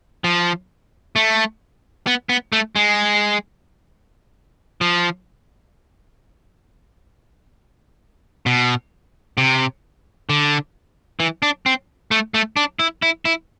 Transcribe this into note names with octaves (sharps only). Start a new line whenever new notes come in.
F3
A3
B3
B3
A3
G#3
F3
B2
C3
D3
E3
D4
C4
A3
A3
D4
E4
E4
E4